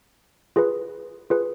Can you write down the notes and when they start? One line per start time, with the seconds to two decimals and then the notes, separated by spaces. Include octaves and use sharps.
0.56 F4 G#4 B4
1.30 F4 G#4 B4